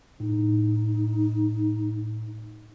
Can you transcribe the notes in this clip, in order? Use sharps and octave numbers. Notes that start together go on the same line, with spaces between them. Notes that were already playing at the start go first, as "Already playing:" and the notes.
A2 D#4